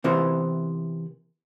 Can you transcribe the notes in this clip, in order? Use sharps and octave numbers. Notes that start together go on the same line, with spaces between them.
C3 E3 B3 E4 A#4 C5